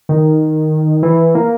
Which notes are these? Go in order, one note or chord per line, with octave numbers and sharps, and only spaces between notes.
D#3
E3
A#3